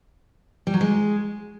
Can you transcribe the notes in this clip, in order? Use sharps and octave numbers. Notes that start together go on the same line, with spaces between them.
G3
F#3
G#3